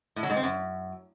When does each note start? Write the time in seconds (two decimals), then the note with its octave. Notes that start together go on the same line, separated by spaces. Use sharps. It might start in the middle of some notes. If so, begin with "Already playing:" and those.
0.16 A2
0.23 F#3
0.30 G#2
0.36 C4
0.43 F#2